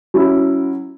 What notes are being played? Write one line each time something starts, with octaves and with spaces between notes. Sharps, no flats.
F#3 C#4 E4